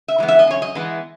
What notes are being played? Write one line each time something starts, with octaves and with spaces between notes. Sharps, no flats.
E5
E3 G#3 B3
E5
D#5
F#2 C#5
D#5
E3 G#3 B3